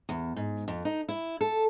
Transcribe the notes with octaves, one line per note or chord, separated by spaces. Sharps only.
E2
G#2
F2
D#4
E4
A4